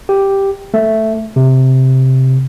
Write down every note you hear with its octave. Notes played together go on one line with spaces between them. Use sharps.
G4
A3
C3